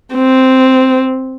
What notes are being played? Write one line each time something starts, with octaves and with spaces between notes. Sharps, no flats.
C4